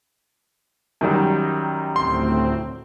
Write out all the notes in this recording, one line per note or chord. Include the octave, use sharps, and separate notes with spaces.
F#2 D#3 G3
D2 A2 C4 C6